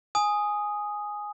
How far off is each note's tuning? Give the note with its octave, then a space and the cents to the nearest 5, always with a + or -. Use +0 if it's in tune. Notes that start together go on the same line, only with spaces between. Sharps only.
G#5 +0 D#6 +0